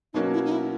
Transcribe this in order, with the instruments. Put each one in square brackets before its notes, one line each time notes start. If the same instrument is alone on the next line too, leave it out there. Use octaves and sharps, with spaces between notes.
[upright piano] B2 F#3 A#3 C#4 F#4 [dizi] D#4
[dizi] E4
D#4
E4